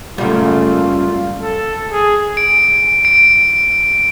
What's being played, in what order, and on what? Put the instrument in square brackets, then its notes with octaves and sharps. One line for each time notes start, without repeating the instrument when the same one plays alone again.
[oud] F#2 C#3 [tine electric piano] G3 [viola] A3 A#3 [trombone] F4
[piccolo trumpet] A4
G#4
[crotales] D7
D7